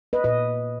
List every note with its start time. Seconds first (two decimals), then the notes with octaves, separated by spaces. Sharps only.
0.13 B4 D#5
0.24 A#2 B4 D#5